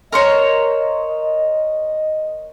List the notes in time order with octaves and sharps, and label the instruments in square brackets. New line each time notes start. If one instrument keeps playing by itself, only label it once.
[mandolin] A#4 C5 C#5 [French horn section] D#5